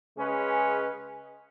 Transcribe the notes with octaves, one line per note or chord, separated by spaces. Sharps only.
C#3 G#3 C#4 G#4 B4